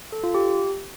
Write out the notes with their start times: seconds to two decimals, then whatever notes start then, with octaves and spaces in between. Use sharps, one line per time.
0.12 A4
0.23 F4
0.34 G4